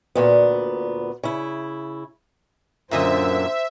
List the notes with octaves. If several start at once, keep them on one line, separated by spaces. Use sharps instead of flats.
D2 A#2 B3
C#3 E4
F#2 A#2 D3 C5 D#5 E5